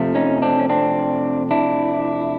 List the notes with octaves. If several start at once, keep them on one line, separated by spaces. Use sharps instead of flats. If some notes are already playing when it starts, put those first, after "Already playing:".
Already playing: F2 C3 F3 A3
C#4 D#4
C4 D4
C#4
C4 D4
D4 E4